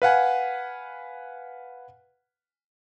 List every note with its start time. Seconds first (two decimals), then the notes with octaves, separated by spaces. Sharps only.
0.02 B4 F5 F#5 G#5